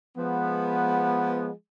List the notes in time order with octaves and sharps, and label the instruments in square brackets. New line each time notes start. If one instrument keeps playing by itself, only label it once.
[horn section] F3 G#3 B3